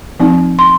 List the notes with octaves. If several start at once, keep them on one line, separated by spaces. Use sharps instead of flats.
F3 C4 D#4
C6